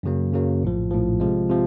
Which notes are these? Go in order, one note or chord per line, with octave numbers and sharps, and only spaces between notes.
F#2 C#3 F#3 A#3
F#2 C#3 F#3 A#3
A#1 A2 F3
A#1 A2 F3
C3 F3 G#3
C3 F3